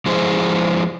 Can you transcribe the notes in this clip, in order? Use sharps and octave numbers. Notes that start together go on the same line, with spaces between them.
F3 G#3 E4 G#4 C5